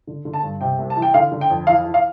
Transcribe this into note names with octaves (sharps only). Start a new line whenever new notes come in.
D3
D3
A5
G2
C3 G5
C2
A5
E3
G5
D3 F5
D3
G5
F2
E3 F5
E3
F5